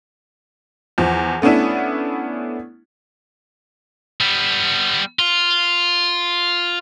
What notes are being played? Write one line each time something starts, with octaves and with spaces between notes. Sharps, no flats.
E2 F3
A3 B3 C#4 D4 E4
G3 B3
F4